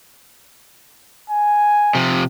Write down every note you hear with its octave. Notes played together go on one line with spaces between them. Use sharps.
G#5
C3 F3